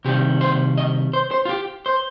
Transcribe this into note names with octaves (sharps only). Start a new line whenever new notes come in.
C3 D#3 G3 G4
C5
D#5
C5
C5
F4
G4
C5